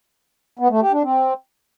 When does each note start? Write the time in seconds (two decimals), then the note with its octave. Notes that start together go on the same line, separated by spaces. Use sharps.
0.59 B3
0.70 A3
0.81 G4
0.92 D4
1.03 C4